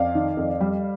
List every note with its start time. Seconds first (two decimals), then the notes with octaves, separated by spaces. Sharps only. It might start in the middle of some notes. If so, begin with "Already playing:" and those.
Already playing: F2 D5 F5
0.15 D#3
0.37 F2
0.61 G3